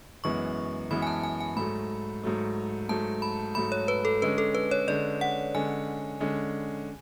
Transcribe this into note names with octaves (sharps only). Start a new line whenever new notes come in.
F#2 E3 G#3 B3 C#6
F#2 E3 G#3 B3 B5
G#5
A5
G#5
G#5
G#2 F#3 A3 B5
G#2 F#3 A3
G#2 F#3 A3 A5
B5
G#2 F#3 A3 B5
C#5
B4
A4
D3 G#3 C#4 B4
A4
B4
C#5
D3 G#3 C#4 D5
F#5
D3 G#3 C#4 G#5
D3 G#3 C#4